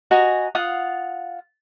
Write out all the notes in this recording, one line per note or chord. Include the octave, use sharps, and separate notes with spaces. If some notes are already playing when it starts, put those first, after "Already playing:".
F#4 D#5 G#5 A#5
F4 F5 F#5 D#6